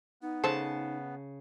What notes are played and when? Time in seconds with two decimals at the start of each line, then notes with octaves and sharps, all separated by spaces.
0.22 B3 D#4
0.44 C#3 G#3 A4 C5 A5